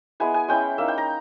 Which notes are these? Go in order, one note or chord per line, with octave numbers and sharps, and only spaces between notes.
G#3 B3 E4 G#5
G#5
G#3 C#4 E4 G5
A#3 D#4 E5
G5
A#5